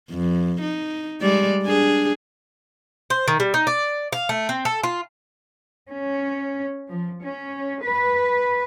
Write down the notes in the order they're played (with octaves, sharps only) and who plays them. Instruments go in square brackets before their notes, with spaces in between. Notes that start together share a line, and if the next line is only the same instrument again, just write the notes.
[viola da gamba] F2
D#4
G3 G#3 D5
D4 G#4
[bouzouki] C5
D#3
G3
D#4
D5
F5
A3
C4
A4
F4
[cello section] C#4
F3
C#4
B4